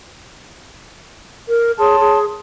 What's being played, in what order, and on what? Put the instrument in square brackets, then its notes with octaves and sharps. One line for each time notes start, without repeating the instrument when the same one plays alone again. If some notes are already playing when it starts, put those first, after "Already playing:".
[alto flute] A#4
[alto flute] G#4 [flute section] C#5 A5 C6
[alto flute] G#4